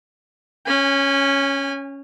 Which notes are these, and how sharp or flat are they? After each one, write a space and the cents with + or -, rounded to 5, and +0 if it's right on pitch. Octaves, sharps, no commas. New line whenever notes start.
C#4 +0 G#5 -30